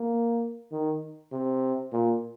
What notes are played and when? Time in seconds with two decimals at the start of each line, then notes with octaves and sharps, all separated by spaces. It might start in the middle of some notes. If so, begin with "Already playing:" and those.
Already playing: A#3
0.72 D#3
1.32 C3
1.93 A#2